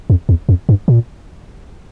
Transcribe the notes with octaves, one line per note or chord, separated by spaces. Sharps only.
F2
E2
F2
G2
A#2